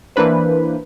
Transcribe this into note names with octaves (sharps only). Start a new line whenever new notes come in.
E3 A#3 D4 B4 C5